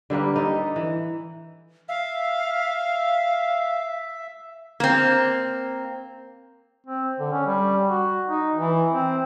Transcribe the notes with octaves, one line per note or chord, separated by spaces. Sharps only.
D3 G3 A#3 B4
D#4 A4
E3
E5 F5
A#3 C4
C4
D3
C#4
G3
F#4
D#4
E3
C4